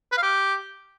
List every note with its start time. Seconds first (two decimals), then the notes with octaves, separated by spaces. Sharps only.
0.12 B4
0.18 F5
0.23 G4